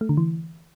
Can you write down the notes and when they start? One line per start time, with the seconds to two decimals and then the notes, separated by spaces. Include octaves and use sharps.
0.01 A3
0.09 D3
0.17 E3